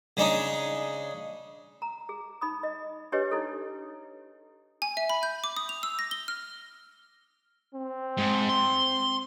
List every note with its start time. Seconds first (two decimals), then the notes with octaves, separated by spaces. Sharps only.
0.17 C#3 G#3 D4 D#4
1.82 A#5
2.09 G#4
2.41 D#4 B5 D#6
2.63 D#5
3.12 D4 G4 G#4 B4 C#5 D#5
3.31 D#4 E4 A4
4.82 G#5
4.97 E5
5.10 B5
5.23 G6
5.44 D6
5.57 D#6
5.69 F7
5.83 E6
5.99 A#6
6.11 G7
6.28 F6
7.74 C4
8.17 G#2
8.49 C6